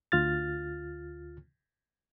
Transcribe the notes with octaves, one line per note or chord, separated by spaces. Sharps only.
D2 F4 F6 A6